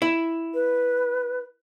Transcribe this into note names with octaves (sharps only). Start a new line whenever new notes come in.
E4
B4